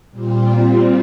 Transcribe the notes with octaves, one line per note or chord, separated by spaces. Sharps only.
A#2 G3 C4 F4